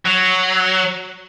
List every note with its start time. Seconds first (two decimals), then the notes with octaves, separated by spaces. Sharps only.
0.05 F#3